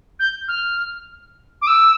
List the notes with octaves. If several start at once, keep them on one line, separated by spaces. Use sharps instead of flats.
G6
F6
D6
E6